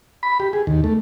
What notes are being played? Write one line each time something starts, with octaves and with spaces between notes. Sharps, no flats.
B5
G4
G#4
D#2
A3